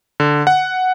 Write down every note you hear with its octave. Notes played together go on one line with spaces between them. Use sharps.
D3
F#5